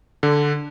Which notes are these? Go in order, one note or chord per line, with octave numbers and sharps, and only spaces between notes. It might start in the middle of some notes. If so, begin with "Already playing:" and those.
D3